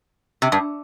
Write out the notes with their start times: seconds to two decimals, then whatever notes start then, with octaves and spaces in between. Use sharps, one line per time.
0.42 C3
0.52 G2